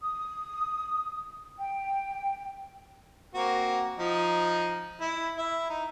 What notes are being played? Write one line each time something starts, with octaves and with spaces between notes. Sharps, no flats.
D#6
G5
A#3 C4 F#4
F3 D#4 D#5
E4
E4 E5
D#4